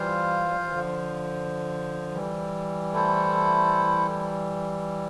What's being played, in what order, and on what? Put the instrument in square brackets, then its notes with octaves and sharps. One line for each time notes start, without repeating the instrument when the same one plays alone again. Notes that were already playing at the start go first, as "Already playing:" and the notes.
Already playing: [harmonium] E3 G3 [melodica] F4 C5 F5
[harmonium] G3
F3
E3
D3 F3
E3 G3
[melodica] A3 E4 A4 C5